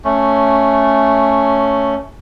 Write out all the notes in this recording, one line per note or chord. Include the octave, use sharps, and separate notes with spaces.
A3 C#4